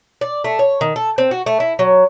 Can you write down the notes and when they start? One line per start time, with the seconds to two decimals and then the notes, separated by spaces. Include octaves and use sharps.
0.21 D5
0.44 A3
0.59 C#5
0.81 D#3
0.96 A4
1.18 C4
1.31 F#4
1.46 A3
1.60 E4
1.79 F#3